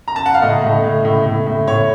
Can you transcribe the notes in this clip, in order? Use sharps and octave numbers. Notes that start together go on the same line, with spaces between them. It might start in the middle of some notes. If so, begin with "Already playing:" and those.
A#5
A5
F#5
F5
A2 D#5
A2
A2
A2
A2
A2
A2 C#5